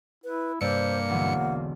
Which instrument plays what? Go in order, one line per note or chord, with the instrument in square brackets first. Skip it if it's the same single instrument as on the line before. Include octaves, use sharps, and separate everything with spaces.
[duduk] E4 [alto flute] B4
[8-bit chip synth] G2 C#7 [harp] C3 D5 E6 [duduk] A#3 [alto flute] C5
[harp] E1 B1 D3 [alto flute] F#5